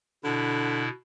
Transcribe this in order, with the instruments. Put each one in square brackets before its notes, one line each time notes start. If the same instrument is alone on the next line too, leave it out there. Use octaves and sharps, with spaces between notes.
[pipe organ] B2 E4 [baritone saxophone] D3